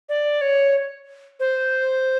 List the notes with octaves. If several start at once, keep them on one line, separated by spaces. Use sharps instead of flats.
D5
C#5
C5